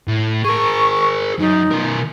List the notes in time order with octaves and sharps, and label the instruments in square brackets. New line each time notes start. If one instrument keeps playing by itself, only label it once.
[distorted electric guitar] A2
[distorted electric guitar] G#4 A#4 [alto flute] C#6
[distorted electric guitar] F#2 [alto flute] D#4
[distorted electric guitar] B2 A#4